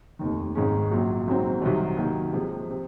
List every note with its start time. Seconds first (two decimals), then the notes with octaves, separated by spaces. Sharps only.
0.19 F1 D#2 D#3
0.55 G#1 G#2 D#3 G#3 C#4
0.91 A#1 A#2 F#3
1.27 G#1 G#2 F#3 C4
1.62 C2 C3 D#3 F#3
1.97 D#3 F#3 A#3
2.33 C3 F3 G#3
2.71 C3